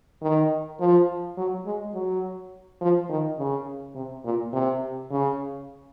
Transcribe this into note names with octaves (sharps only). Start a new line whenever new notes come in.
D#3
F3
F#3
G#3
F#3
F3
D#3
C#3
C3
A#2
C3
C#3